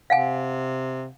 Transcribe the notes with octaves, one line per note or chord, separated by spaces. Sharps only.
C3 F5 F#5 G#5